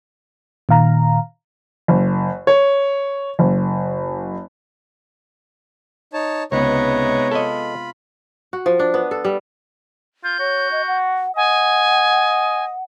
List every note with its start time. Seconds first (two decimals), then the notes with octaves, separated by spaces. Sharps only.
0.69 A#2 D#3 F5 A#5
1.88 F#1
2.47 C#5
3.39 F#1
6.13 D#4 C#5 A5
6.52 C#2 C3 G#3 B3 D#4 B4 C#5 A#5
7.32 F4 A4 D#5 B5
8.53 F#4
8.66 F3
8.79 D4
8.94 B3
9.11 A4
9.25 G3
10.24 F4 G6
10.39 F#4 C#5
10.72 D#5
10.88 F#5
11.36 D#5 F#5 G#5